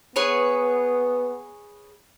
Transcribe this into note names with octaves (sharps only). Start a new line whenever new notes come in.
B3 G#4 B4 C#5